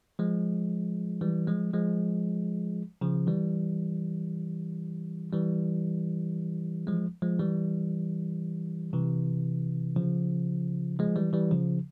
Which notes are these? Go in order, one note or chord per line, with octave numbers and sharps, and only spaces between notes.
F3 G#3
E3 G3
F3 G#3
F3 G#3
C#3 F3
E3 G3
E3 G3
F3 G#3
F3 G#3
E3 G3
C3 E3
C#3 F3
F3 G#3
E3 G3
E3 G3
C#3 F3